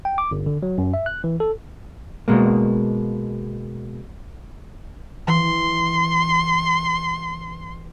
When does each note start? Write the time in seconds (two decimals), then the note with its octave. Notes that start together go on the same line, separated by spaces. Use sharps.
0.05 G5
0.18 D6
0.31 G1
0.46 D3
0.63 F#3
0.78 F#2
0.94 E5
1.06 F#6
1.24 E3
1.40 A4
2.28 B2 G#3 A#3
5.27 E3 C6